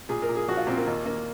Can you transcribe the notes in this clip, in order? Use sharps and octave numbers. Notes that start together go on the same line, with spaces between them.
A#2 G#4
A#4
A#2
G#4
F3 F#4
F4
A#2 C4
A#3
D#2
A#3